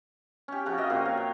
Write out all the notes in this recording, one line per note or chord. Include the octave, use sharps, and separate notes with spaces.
C#4 G4
C#3 F3 F#4
G4 D#5 E5
A#2 C4 F#4
C#5 F5
G5